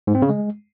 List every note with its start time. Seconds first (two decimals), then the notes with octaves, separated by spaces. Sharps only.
0.07 G#2
0.15 C4
0.22 C#3
0.29 G#3